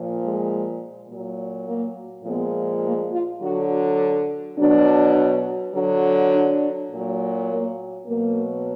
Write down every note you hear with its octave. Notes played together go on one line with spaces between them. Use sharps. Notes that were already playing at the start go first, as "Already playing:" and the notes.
Already playing: A#2 F3
G#3
A#2 F#3
A#3
A#2 F3 G#3 B3
A#3
F4
D3 F#3 F#4
B2 F#3 D4
D3 F#3
D4
A#2 F#3
A#3
B2 F#3 A#3